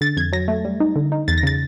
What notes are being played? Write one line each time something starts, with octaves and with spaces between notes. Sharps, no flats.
D3 A6
F2 G#6
F#3 A#6
A3
G3
D#4
D3
D#4
E2 A6
A#6
C#3 A6